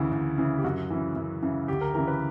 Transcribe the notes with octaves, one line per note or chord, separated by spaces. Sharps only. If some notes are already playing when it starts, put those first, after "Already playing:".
Already playing: D2 C#3 E3 E4
D2
C#3 E3
G4
F#2 F#4
C#3 E3
F#2
C#3 E3
D2 G4
A#4
C#3 E3 A#4
B4